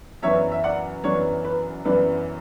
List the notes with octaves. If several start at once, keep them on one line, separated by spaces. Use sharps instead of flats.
F#2 E3 B3 D4 C#5 E5
E5
D5 F#5
F#2 E3 B3 D4 C#5
B4
F#2 E3 B3 D4 B4